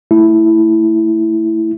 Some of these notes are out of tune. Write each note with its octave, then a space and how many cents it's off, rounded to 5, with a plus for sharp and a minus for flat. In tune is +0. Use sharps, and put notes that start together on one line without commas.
A3 +25 E4 +0